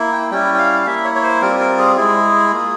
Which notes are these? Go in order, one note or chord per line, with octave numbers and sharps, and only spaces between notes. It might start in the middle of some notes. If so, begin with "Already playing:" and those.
Already playing: A#3 E4
G5
G3 C#4 E4 G5
G5
F5
F5
A#3 E4 E5
C#5
C#5
C5
G3 C4 F4 A#4
A#4
G#4
G#3 E4 G#4
A#3 F4